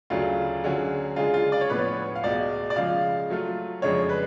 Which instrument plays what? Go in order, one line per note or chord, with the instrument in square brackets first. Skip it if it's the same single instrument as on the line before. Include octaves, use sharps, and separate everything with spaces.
[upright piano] D2 C#3 F#3 A3 D4 [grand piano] F4
[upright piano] D3 F#3 C#4 G#4
[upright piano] C#3 G#3 D4 G#4 [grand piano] F4
[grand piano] F4
D5
C#5
[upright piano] A2 F3 B3 [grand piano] B4
[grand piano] C#5
F5
[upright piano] C#2 B2 G#3 [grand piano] D5
[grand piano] D5
[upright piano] C#3 F3 G#3 [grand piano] F5
[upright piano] F#3 A3 F4
[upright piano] F2 C#3 G#3 D4 [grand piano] C#5
[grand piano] B4